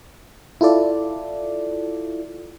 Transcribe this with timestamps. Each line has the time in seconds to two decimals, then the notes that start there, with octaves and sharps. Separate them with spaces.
0.61 E4 F4 A4 D5